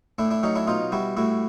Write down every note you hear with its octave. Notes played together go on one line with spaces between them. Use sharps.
A2 D4 E4
D4 E4
F#3 C#4 D#4
D4 E4
B2 D#4 F4
G3 E4 F#4
A2 E4 F#4